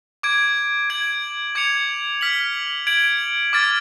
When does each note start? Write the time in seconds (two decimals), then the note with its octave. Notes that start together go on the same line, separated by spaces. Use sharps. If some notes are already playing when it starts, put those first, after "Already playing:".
0.23 D6 G#6 D7
0.90 G#6 D7 F#7
1.55 D6 G#6 C#7 F7
2.21 F6 B6 F#7
2.87 G#6 D7 F#7
3.53 D6 F6 A6